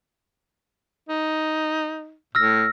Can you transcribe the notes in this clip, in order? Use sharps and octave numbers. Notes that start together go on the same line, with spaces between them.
D#4
A2 E6 F6 A#6